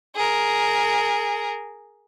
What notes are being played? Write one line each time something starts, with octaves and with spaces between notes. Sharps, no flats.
G#4 A#4